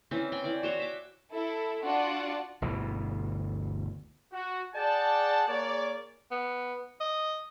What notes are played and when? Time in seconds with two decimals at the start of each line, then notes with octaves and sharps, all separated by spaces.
0.11 E3 C4 C#4
0.32 G5 G#5
0.44 E3 D5
0.63 F#4 C5 C#5
0.79 E5 D6
1.31 E4 A4
1.83 D4 F4 F#4 D5 F#5
2.62 G1 D2 B2 E3
4.33 F#4
4.75 G#4 D5 F#5 G5 A5
5.48 A#3 G#4 C#5 D5
6.31 B3
7.01 D#5